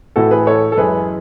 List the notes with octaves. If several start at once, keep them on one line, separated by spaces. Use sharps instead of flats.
A2 E3 A3 F#4 A4
G#4 B4
A4 C#5
A4
F#2 E3 G#3 G#4 B4